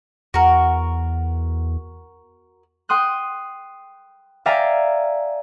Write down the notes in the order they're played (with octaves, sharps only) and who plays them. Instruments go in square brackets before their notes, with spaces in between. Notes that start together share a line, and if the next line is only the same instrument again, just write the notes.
[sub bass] E2 [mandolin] F#4 A#4
[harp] G5 C6 D#6 F#6
D5 E5 F5 G5 G#5 A#5